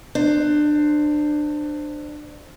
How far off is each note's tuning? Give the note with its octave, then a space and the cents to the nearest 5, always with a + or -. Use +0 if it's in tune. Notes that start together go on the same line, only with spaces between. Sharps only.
D4 +25 C5 +0